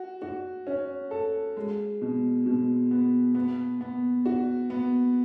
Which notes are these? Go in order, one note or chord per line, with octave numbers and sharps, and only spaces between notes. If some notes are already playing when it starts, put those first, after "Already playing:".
Already playing: F#4
F#4
C#4
A4
G#3
B2
B2
B3
B3
B3
F#4
B3